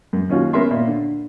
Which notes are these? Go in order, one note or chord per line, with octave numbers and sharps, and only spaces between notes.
F#2
D#2 C#4 F4 F#4
B3 C#4 A#4 E5 C6
A#2
D3